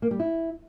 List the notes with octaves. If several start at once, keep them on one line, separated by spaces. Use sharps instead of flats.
A#3
G3
E4